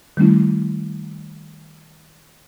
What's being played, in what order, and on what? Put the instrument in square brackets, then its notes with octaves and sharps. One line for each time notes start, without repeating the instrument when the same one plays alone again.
[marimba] D#3 G3 A3 C#4 E4